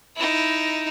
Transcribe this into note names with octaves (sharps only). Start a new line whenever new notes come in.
D#4 E4